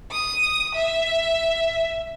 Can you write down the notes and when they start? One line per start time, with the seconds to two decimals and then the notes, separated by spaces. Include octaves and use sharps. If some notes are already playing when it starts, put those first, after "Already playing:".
0.11 D#6
0.75 E5